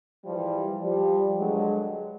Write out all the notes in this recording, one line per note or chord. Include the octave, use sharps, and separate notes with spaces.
G#2 E3 F3 G3
F3 G3
G2 D3 F#3 G#3